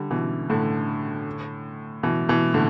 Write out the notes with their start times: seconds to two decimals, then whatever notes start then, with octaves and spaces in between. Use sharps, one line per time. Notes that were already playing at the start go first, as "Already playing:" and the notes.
Already playing: D3 G3
0.11 B2 E3
0.50 A2 D3
2.03 B2 E3
2.29 B2 E3
2.54 A2 D3